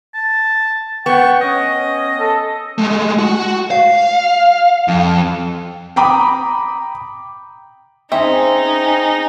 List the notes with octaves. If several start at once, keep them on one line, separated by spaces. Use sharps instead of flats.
A5
B3 G5 C#6
C#4 D#5
C#4
A4
G#3 A3
F#4
F5
F2
G5 A#5 B5 D6 D#6
C4 C#4 D#4 G#4 C5 D#5 E5